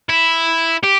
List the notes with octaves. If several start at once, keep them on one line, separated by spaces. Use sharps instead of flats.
E4
G4